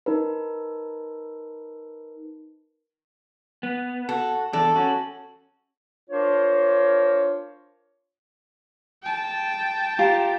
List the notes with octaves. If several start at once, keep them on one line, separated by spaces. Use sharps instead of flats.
D#4 A#4 B4
B3
F#4 A4
E2 D4 A4
C#4 F#4
D4 F4 A#4 C5 C#5
G5 A5
F4 G4 A#5